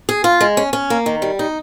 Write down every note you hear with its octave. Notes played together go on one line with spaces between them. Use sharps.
G#4
F4
G#3
C#4
C#4
A#3
D#3
G3
D#4